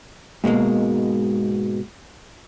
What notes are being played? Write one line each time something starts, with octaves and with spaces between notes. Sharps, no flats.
G#2 B2 D#3 G#3 A#3